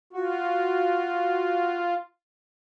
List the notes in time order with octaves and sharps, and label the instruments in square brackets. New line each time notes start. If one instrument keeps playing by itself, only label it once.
[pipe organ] F4 [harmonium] F#4